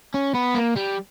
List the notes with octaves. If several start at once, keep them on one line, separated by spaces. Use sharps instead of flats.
C#4
B3
A#3
G3